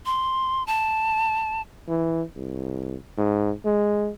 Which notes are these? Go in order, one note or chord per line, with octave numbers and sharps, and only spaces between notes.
C6
A5
E3
C2
G#2
G#3